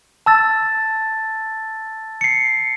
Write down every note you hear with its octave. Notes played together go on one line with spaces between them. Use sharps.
A5 E6 A6
C7 C#7